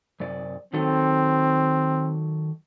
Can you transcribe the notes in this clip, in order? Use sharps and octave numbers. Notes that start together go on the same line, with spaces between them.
F#2 C3 D5
D#3 F#3 C4 A4